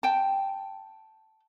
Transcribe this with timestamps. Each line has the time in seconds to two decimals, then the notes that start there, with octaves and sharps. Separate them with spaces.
0.03 G5 A5